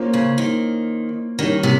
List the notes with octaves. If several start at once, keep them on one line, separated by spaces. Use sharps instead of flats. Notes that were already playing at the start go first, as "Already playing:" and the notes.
Already playing: A#3 C#4 F4 C5
C#3
D#3
D#3 G3 C#4 G4 A#4
C3